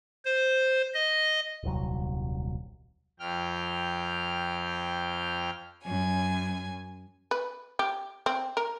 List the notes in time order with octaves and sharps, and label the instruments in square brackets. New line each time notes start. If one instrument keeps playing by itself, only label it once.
[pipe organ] C5
D#5
[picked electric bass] D#1 C2 F#3
[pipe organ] F2 G5 F6
[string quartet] F#2 G#5
[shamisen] B4
G4
C4
A#4